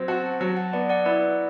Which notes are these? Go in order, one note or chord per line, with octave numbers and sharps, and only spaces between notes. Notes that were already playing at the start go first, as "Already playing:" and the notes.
Already playing: F#3 C4
F#4 F#5 A5
F#3 F#5 A5
F#5 A5
B3 D5 F#5
D5 F#5
E4 B4 D5